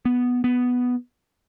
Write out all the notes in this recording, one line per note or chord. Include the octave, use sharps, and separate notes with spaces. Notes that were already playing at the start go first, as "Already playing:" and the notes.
B3
B3